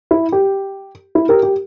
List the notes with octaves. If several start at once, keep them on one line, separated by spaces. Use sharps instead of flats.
E4
G4
E4
G4 A#4
G4